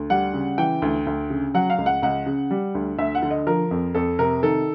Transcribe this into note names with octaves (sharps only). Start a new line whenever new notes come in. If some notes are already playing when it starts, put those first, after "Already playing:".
Already playing: D2
G3 F#5
C#3
E3 G5
D2
D2
C#3
F#3 F#5
F5
C#2
F#5
C#2 F#5
C#3
G3
D2
D2 E5
F#5
D3
D#5
F3 A#4
F2
F2 A4
C3 A#4
D#3 A4